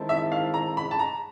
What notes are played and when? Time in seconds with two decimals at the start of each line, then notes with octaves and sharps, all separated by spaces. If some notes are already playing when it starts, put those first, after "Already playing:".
Already playing: D#3 G#3 C4 E4 A4
0.09 E5
0.32 F5
0.54 A#5
0.77 B5
0.91 A5
0.99 A#5